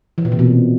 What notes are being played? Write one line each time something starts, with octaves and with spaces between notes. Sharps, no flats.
E3
A#2
C3
B2